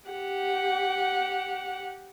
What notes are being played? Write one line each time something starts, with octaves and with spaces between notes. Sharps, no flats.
G4 F#5